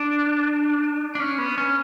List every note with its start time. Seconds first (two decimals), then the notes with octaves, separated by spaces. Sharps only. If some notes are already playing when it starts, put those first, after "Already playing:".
Already playing: D4
1.15 D4
1.20 C#4
1.38 B3
1.58 C#4